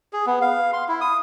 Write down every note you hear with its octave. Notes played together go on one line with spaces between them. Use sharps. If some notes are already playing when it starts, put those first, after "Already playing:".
G#4
B3
F5
C6
E4
D#6